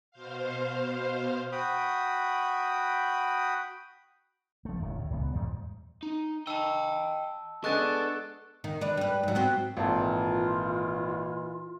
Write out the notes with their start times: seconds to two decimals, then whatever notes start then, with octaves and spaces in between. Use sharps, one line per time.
0.11 B2 C5 F5
1.52 F#4 G5 B5 D#6
4.65 F3 A3
4.78 D1 F#2 D#3
4.99 A2
5.11 D#1 C#2 B3
5.33 E2 G#2 E3 G3
6.03 D#4
6.47 D#5 G5 A5 E6
7.64 G#3 B3 D4 A4 C#6 F#6 A6
8.64 D#3
8.81 D4 B4
8.97 G3 B4
9.23 G#2 F#3
9.35 B3 C4 F#4
9.77 G#1 A#2 E3 D#4 F4 A4